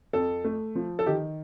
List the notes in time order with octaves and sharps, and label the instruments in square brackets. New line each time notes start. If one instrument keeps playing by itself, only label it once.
[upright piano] F2 A4
A3
F3
A4
D#3 G4